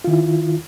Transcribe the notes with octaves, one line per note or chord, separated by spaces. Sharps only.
D#3 E4 F4